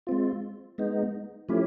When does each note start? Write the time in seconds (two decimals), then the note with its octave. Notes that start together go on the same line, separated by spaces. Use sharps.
0.07 G#3 C4 F4
0.78 G#3 B3 D#4
1.49 F3 A3 C#4 E4 G4